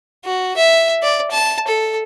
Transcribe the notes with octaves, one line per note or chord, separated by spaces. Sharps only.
F#4
E5
D5
A5
A4